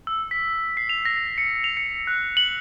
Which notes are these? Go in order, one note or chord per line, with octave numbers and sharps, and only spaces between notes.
E6
B6
C7
F7
A#6
C#7
F7
C#7
F#6
F#7